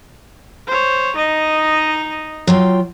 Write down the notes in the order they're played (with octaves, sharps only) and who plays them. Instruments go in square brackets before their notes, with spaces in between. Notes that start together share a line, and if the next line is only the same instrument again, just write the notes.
[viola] C5 C#5
D#4 D#5
[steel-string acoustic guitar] F#3 F4 G5